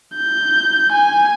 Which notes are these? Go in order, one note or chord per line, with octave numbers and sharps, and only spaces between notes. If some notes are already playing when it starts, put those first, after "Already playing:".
G6
G#5